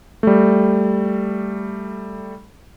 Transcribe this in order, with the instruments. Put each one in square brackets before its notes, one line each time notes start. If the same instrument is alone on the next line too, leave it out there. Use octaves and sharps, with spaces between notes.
[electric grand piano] G3 A3